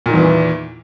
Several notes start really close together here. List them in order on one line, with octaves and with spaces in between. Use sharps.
A#2 D#3 E2 E3